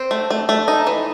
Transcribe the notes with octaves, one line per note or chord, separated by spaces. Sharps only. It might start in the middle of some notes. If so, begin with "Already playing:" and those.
Already playing: C4
A3
A3
A3
D#4
E3